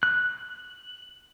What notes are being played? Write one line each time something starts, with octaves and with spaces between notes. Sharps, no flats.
F#6